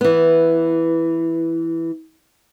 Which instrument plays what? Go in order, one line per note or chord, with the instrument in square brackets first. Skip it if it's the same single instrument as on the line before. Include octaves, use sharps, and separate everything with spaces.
[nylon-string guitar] E3 B3